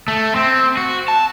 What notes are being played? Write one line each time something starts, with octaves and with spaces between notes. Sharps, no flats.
A3
C4
F#4
A5